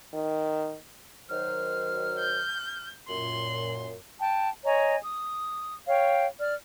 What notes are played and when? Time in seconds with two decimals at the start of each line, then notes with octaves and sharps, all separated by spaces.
0.13 D#3
1.29 D#3 F#3 C5 F6
2.19 G6
3.09 F#2 A#2 C6 F#7
4.21 G5 A5
4.65 C#5 D#5 G#5 A#5
5.04 D#6
5.88 C#5 F5 G5
6.39 D5 F6